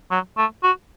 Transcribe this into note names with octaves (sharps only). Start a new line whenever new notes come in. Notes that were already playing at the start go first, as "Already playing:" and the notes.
F#3
A3
F#4